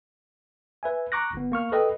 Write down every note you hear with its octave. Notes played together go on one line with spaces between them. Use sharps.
B4 E5 G#5
A#5 C#6 D6 F#6 A#6
G1 B3
A#3 C#6 F6
A4 B4 D#5 G5